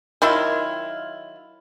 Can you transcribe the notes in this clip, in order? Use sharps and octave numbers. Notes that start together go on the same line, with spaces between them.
D#3 F#3 E4 F4